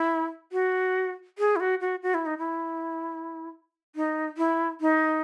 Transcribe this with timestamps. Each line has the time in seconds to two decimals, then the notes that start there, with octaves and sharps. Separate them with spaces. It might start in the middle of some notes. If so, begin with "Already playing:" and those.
Already playing: E4
0.52 F#4
1.39 G#4
1.56 E4
1.60 F#4
1.81 F#4
2.03 F#4
2.14 E4
2.26 D#4
2.38 E4
3.96 D#4
4.38 E4
4.81 D#4